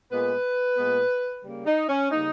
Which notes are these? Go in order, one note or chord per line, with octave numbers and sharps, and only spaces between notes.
A#2 G#3 B3 B4
A#2 G#3 B3
C#3 G3 A#3
D#4
C#4
C#3 G3 A#3 D#4